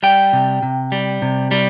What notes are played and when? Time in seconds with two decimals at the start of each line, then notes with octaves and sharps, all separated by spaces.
0.03 G3 G5
0.33 C3
0.63 C3
0.92 G3
1.22 C3
1.51 G3